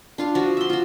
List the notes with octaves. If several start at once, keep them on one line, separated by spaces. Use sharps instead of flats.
D4 F4 F5
F3 F#4 C#5
E5 C6
F4 F#4